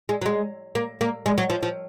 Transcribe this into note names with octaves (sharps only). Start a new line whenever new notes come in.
G#3
F#3
G#3
A#3
A#3
G#3
F#3
F3
F3